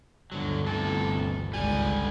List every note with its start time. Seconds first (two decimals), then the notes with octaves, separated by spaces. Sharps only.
0.32 G1 D2 D3 F#3
0.66 C3 E3 A4
1.53 G#1 C#2 D3 G3 G#5